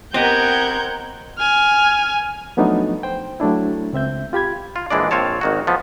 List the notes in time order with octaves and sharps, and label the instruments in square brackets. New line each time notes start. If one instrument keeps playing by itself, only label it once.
[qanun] B3 D#5 [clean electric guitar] C4 G4 [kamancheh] A#4 F#5 [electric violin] G6 G#6
[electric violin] G#5 F6
[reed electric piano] F3 F#3 A3 B3 D4 D#4
C5 G5
F#3 A3 D4 E4
C#2 C4 E5 G6
F4 G4 B5 G#6
[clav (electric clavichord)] F4
A#1 E3 G#3 D4 D5
A#1 C4 F4 C#5 A5
G#1 D#3 F#4
F3 B3